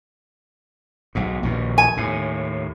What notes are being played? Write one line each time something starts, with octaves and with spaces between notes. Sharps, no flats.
B1 G#2
A#1 D#2 B2
G#5
D#2 A2